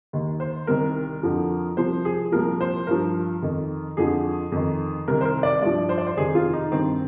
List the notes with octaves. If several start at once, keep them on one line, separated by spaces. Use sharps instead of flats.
D#2 D#3
C5
C2 C3 D#3 A#4
F2 D3 F3
C2 C3 F3 C5
G#4
C2 A#2 F3 A#4
C5
G2 F3 A#4
F2 D#3
F2 D3 F3 G#4
F2 D#3
C2 C3 D#3 A#4
C5
A#4
D5
G2 F3 D5
C5
D5
C5
F2 C3 D#3 G#4
F4
D#4
G2 D#3 C4